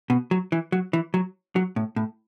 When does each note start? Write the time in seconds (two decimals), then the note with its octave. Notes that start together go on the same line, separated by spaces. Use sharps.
0.10 B2
0.31 F#3
0.52 E3
0.72 F#3
0.93 E3
1.14 F#3
1.56 F#3
1.76 A2
1.96 A2